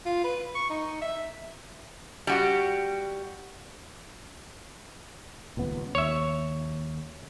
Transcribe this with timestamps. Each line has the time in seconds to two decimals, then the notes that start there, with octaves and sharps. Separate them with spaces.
0.06 F4
0.24 B4
0.55 C#6
0.70 D#4
1.01 E5
2.27 G3 F#4 G4
5.57 D#1 C#2 B3
5.95 D#2 C#5 E5